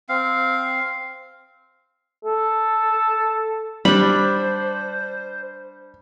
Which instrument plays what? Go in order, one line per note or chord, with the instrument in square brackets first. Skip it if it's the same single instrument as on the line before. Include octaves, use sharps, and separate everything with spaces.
[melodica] C4 F5
[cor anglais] A4
[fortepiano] G3 [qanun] D4 B5 [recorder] C5